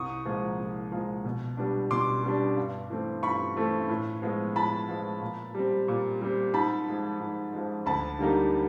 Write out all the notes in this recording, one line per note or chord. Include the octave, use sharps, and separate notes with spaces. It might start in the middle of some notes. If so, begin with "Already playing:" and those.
Already playing: C2 C#6 D#6
A#2 F3 G#3
C2
A#2 F3 G#3
B2
G3 B3 D4
B2 C6 D6
G3 B3 D4
G2
E3 A3 C4
G2 B5 C#6
E3 A3 C4
A2
F3 G#3 B3
A2 A5 B5
F3 G#3 B3
A#2
G3 C4
A#2
G3 C4
G#2 A5 B5
F3 G#3
G#2
F3 G#3
D2 A5 B5
D3 G3 A#3 D#4